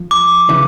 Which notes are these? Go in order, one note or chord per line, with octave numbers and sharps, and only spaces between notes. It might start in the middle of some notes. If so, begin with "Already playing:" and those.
Already playing: F3
D6
C#3 E3